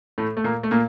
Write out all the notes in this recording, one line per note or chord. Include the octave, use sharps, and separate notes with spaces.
A2 A3
A3
A#2 A#3
A3
A#2 A#3